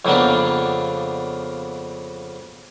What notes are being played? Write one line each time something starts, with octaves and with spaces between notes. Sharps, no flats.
F2 C#3 A#3 B3 D4